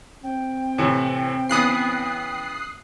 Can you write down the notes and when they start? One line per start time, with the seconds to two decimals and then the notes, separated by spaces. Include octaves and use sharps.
0.24 C4 G5
0.78 A2 C3 E3
1.49 C#3 E3 B3 D#6 F#6 C7